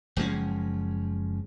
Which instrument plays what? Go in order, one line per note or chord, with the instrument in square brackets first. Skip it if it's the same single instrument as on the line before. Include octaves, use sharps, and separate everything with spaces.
[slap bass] F#1 F3 G#3 C#4